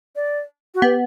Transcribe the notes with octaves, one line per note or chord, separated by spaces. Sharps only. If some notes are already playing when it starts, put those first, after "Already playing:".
D5
F#4
B3 G4